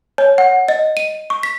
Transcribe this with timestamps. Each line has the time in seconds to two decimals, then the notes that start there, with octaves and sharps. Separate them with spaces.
0.18 C#5
0.38 F#5
0.68 D#5
0.97 D#7
1.30 C#6
1.43 B6